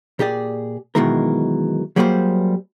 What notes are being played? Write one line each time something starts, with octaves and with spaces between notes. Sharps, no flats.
A#2 G4 G#4 D5
B1 B2 D#3 E3 G#3 A#4
F#3 G3 A#3 G#4 B4 C5